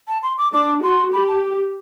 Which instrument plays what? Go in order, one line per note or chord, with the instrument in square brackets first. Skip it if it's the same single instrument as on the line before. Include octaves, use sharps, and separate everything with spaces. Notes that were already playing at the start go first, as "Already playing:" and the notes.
[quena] A5
C6
D6
[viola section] D4 [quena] D6
[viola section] F#4 [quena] C6
[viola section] G4 [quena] B5
[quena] A5